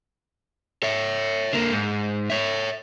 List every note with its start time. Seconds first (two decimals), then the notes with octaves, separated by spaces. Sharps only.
0.83 C#5 E5
1.53 D3 A#3
1.72 G#2
2.30 C#5 E5